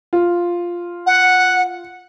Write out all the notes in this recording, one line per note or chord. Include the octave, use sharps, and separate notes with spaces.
F4
F#5